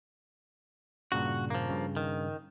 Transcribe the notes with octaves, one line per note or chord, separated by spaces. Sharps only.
G2 A#2 C#3 F#4
F3 A#3
G2 C#3
D#3